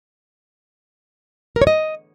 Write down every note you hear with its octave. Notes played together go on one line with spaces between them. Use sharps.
A#4
C#5
D#5